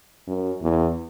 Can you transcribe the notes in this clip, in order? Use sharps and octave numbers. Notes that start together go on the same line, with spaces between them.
F#2
E2